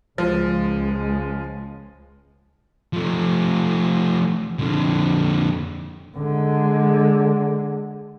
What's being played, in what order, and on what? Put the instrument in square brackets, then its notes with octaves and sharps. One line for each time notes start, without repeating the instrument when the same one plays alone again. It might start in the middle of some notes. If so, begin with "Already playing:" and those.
[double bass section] C#2 G#3 [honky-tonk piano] F3
[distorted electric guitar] F3 A3
F2 D3
[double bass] D3 G#3